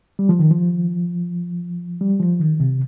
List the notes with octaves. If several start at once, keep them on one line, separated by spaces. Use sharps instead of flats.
G3
F3
D#3
F3
G3
F3
D#3
C3